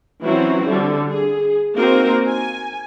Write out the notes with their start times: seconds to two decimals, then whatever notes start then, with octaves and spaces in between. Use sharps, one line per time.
0.24 E3 F#3 C4 C#4 E4 F#4
0.66 D3 G3
1.11 G#4
1.76 A#3 C4 D#4 F#4 A#4 C5
2.28 G#5